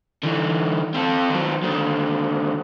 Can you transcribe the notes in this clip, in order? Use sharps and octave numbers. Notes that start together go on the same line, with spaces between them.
D3 E3
C4 A4
D#3 F#3
D#2 D3